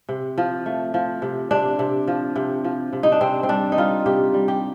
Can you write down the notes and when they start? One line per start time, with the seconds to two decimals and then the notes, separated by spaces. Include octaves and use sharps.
0.09 C3
0.38 F3
0.66 A3
0.94 F3
1.22 C3
1.51 C3 D4
1.79 C3
2.08 F3
2.36 C3
2.64 F3
2.93 C3
3.03 D#4
3.12 D4
3.21 C3 C4
3.43 C4
3.49 G3 D4
3.72 D#4
3.77 G3 F4
4.06 C3 G4
4.34 G3
4.48 G4